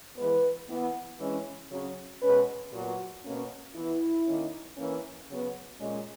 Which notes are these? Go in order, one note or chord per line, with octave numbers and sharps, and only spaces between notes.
E3 G#3 B3 B4
E3 B3
E3 G#3 C#4
C#3 F#3 C#4
B2 G#3 C#4 B4
A#2 F#3 B3 F#4
B2 A#3 C#4
E3 B3 E4
D#3 A#3 C#4
E3 A#3 C#4
C#3 F#3 B3
A#2 G#3 C#4 G#4